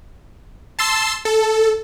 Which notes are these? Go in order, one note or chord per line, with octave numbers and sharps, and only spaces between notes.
A5 C6 E6
A4